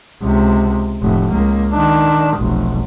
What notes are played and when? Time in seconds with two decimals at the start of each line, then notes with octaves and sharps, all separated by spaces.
0.22 C#2 C3
1.02 F1 A2
1.32 C#2 A#3
1.72 D#3 D4
2.37 F1 B1